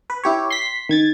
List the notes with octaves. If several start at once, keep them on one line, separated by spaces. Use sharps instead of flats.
B4
E4 G4 C#5
C6 B6
D#3 G#6 A6